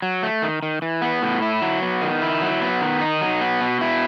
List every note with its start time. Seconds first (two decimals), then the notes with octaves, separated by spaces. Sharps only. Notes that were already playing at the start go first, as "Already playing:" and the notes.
0.02 F#3
0.23 A3
0.42 D#3
0.63 D#3
0.82 E3
1.02 B3
1.22 A2
1.42 E4
1.62 F#3
1.82 B3
2.01 D#3
2.22 E4
2.42 F#3
2.61 B3
2.81 D#3
3.01 D#4
3.21 F#3
3.41 B3
3.61 B2
3.81 E4